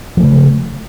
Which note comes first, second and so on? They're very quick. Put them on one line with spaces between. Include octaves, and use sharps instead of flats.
F3 A3 C#3